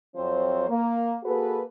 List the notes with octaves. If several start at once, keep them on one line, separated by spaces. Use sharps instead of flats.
F2 F3 F#3 C4 C5 C#5
A#3
A#3 F#4 G#4 A4 B4